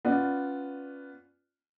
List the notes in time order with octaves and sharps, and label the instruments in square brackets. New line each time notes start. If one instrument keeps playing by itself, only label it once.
[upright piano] B3 C#4 F4 D5